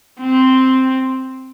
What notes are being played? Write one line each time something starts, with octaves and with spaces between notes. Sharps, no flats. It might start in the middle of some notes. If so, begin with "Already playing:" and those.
C4